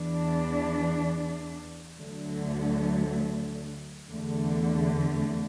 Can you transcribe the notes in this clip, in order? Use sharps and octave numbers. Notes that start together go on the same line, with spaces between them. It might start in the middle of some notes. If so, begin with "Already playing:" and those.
Already playing: E2 E3 D4
D2 D3 F#3 A3
E2 D3 A3